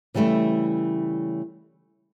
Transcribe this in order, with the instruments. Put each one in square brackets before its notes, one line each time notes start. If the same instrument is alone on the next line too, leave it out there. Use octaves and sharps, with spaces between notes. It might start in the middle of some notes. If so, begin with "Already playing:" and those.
[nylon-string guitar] C#3 E3 G3 A3 E4